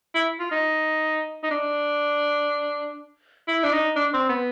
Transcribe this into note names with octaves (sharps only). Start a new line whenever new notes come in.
E4
F4
D#4
D#4
D4
E4
D4
D#4
D4
C4
B3